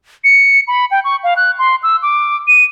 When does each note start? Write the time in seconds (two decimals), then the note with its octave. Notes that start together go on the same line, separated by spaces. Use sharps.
0.24 C#7
0.68 B5
0.91 G5
1.04 C#6
1.24 F5
1.37 F#6
1.59 C6
1.83 E6
2.02 D6
2.48 D#7